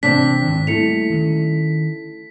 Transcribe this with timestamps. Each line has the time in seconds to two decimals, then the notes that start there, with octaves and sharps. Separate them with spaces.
0.03 C3 E3 F3 C4 D4 B6
0.45 G#2 D#3
0.67 G3 A3 A#3 E4 C#7 F7
1.10 D#3 C#4